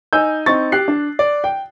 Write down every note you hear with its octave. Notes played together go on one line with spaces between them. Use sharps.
D#4 G#5 E6 G6
C4 D#4 C#6 A6
G4 F#6 C7
D4
D5
G5